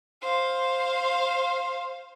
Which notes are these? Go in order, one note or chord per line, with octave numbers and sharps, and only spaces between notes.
C5 F5